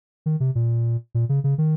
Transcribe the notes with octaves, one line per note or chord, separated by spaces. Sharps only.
D#3
C3
A#2
A#2
C#3
C#3
D#3